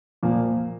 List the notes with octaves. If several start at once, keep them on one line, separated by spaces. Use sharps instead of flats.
A#2 F3 A#3